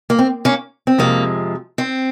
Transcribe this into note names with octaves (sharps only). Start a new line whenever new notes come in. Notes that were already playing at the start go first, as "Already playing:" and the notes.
A#3
C4
A#3 C#4
C4
F2 C3 F3 G#3 A#3
C4